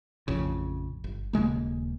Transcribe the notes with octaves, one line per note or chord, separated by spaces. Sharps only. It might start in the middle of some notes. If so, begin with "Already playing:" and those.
A1 F2 C#3
G1
D#1 C#3 G#3 A#3